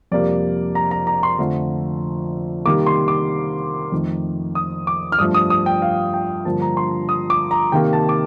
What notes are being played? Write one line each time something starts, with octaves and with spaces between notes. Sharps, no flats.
F2 C3 G3 A#3 D5
A#5
A#5
A#5
C6
F2 D3 F3 A3
C3 D#3 G3 A#3 D6
C6
D6
F2 D#3 A3
D#6
D6
F6
G2 F3 A3 D#6
D#6
D#6
G5
F5
G5
G2 D3 F3 A#3 A5
A#5
C6
D#6
D6
A#5
C3 D#3 A#3 G5
A5
D6